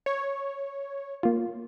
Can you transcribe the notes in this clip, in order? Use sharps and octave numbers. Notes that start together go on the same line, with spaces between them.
C#5
A#3 F4